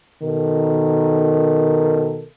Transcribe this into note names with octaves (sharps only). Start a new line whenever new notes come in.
B2 D#3 A4 A#4